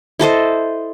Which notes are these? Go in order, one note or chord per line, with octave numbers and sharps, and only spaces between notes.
E4 A4 C5 D#5